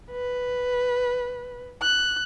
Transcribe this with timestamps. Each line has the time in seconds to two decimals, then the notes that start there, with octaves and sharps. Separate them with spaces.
0.11 B4
1.82 F#6